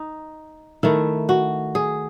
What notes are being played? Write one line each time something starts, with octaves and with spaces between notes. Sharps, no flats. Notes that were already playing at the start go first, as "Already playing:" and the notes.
Already playing: D#4
D#3 A3 E4
F#4
G#4